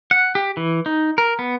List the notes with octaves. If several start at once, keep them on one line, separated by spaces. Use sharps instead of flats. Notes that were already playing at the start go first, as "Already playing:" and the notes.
F#5
G4
E3
D#4
A#4
B3